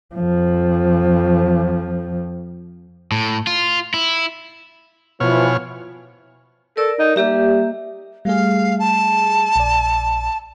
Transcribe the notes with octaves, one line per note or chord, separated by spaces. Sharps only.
F2 F3
A2
F4
E4
B2 E3 F3 C#5 F6
A4 A#4 D5
D#4
G3 A#3 G4 E5
G3 A3 G#4 F5
A5
A#1 D5